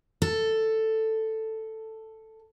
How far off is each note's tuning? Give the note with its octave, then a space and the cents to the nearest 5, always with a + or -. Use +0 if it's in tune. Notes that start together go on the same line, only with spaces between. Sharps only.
A4 +5